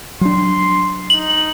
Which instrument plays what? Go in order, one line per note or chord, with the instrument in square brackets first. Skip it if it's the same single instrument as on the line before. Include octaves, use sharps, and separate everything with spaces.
[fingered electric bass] F#3 D4 [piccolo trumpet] C6
[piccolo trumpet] D#4 [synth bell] F#7